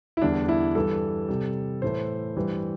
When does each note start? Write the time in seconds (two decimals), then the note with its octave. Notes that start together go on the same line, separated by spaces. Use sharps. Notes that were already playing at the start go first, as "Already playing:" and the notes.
0.17 E4
0.22 E2 D3 G3 D4
0.49 E4
0.75 G2 E3 G3 A4
1.28 C3 G3
1.82 A2 E3 A3 C5
2.37 G2 E3 G3